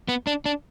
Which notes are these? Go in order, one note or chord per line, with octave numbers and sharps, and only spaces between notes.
B3
D4
D4